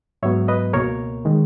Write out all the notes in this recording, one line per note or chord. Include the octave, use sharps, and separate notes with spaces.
G#2 F#3 B3 C#5 E5
B4 D#5
C#2 B2 A#3 A#4 C#5
D#3 G#3